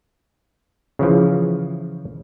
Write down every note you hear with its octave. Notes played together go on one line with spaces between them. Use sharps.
C#3 E3 F3